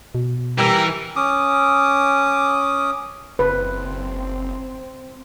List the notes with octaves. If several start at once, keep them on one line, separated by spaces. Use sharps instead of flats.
B2
E3 G3 G4 A#4 E6
C#4 D6 D#6
F#1 C4 B4